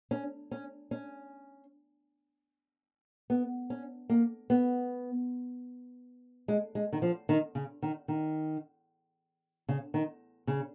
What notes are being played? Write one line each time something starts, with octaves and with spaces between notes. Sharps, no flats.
C#4
C#4
C#4
B3
C#4
A#3
B3
G#3
G#3
D#3
F3
D#3
C#3
D#3
D#3
C#3
D#3
C#3